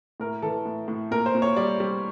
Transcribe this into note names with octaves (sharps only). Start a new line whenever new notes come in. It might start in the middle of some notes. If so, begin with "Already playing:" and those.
A2 A#4
E3 A4
A2
A2
A#2 A#4
C5
A#2
C#5
G3 D5
G3